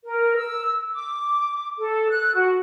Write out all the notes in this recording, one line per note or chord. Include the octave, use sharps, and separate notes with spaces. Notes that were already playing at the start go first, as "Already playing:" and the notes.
A#4
E6
D6
A4
F#6
F#4